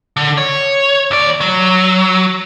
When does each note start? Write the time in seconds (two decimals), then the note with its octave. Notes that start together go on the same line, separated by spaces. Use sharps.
0.17 D3
0.37 C#5
1.11 D#2 D5
1.41 F#3